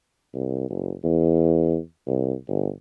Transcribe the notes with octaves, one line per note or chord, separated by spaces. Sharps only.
C2
F#1
E2
C2
G1